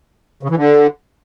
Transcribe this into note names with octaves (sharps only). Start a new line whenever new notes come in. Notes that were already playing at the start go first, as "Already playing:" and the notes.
C#3
E3
D3